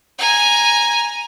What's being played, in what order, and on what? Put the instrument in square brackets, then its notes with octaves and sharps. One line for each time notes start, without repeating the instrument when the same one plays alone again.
[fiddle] G#5 A#5